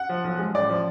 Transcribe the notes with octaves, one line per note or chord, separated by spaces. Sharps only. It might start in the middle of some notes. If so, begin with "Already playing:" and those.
Already playing: F#5
F3
B1
G#3
A1 D5
F3